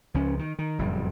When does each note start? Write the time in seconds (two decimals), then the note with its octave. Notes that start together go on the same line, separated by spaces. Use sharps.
0.14 C#2 F3 C#4
0.39 D#3
0.59 D#3
0.79 F#1 F2 A2 G3